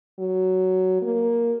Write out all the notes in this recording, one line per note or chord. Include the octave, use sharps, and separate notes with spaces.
F#3
A#3